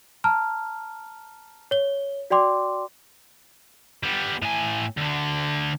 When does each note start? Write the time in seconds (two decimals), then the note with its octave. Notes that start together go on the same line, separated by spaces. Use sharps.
0.24 A5 A#5 F6
1.71 C#5 G7
2.30 F#4 D5 G5 C6 D6
4.03 G3 B3
4.42 A2 G#5
4.97 D2 D3